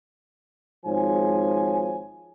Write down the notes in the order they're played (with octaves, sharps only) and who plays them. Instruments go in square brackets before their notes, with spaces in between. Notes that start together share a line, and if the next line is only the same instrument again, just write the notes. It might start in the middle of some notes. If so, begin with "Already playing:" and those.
[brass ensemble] G#1 G#2 F3 C#5 G#5